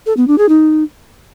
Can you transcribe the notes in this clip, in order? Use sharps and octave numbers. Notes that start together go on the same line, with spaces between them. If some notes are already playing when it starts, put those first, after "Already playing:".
A4
B3
D4
G#4
D#4